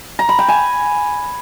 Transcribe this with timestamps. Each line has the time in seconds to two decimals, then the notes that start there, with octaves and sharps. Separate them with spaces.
0.19 A#5
0.29 B5
0.39 G5
0.48 G#5